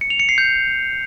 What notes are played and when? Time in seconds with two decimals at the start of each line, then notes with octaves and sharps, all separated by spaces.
0.01 C#7
0.10 F7
0.20 C#7
0.29 C7
0.38 G6